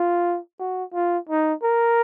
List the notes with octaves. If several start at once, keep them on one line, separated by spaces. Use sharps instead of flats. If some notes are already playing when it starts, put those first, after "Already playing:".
Already playing: F4
F#4
F4
D#4
A#4